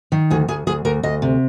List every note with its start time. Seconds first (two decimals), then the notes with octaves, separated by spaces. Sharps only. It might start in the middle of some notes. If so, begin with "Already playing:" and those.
0.12 D#3
0.30 D2 G#4
0.48 D2 G#4
0.67 D2 G#4
0.85 D2 A#4
1.03 D2 D#5
1.22 C3